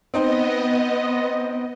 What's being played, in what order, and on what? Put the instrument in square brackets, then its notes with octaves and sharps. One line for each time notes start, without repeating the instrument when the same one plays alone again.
[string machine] B3 D#5 [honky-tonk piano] C4 D#4 C5